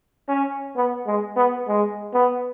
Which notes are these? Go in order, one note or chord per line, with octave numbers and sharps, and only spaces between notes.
C#4
B3
G#3
B3
G#3
B3